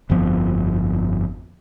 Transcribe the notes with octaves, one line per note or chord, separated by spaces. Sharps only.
G1 F2 F3 B3